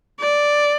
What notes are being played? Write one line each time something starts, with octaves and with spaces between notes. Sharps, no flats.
D5